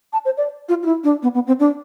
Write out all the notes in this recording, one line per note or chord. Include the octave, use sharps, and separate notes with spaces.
A5
C5
D5
F4
F4
E4
D4
B3
B3
C4
D4